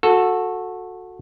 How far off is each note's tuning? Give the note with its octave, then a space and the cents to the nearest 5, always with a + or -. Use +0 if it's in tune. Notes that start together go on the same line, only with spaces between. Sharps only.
F#4 -20 A4 +0